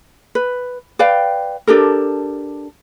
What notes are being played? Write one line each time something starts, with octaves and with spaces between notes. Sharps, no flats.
B4
B4 D5 F5 G5
D4 G4 A4 A#4